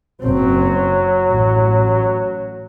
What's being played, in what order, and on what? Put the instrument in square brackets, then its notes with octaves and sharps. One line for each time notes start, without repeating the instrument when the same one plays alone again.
[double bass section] F#1 C4 [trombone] F#3
[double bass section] A1